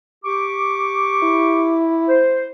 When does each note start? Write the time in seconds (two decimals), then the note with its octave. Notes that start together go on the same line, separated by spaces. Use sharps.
0.25 G4 C#6 D6
1.23 E4
2.09 C5